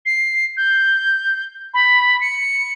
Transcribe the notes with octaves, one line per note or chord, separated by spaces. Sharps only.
C7
G6
B5
C#7